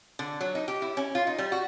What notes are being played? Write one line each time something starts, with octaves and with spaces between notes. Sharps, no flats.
D3
F#3
D#4
G4
E4
C#4
F4
D#4
G3
F#4